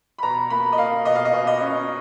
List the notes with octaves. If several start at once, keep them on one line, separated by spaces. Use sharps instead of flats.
B5
B2 A#5
A#3 B5
D#5
A#3 F5
B2 D#5
F5
D#5
B2
D#5
C#4